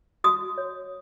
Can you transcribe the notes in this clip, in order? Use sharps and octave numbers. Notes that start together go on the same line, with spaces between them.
F#4 D#6
C#5